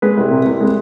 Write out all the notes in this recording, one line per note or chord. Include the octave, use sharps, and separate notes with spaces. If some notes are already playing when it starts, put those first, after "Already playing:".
G#3 B4
C2
C3
C2
G#3